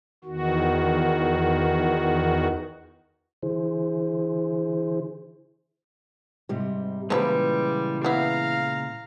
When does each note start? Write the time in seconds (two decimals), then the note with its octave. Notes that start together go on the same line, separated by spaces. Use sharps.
0.25 E2 D#3 F#4
3.43 D3 E3 E4 G#4 C5
6.49 G#2 C3 G3
7.10 A#2 C#3 E3 F3 G3 G#3 A#4 B4
8.04 B3 E4 F5 A#5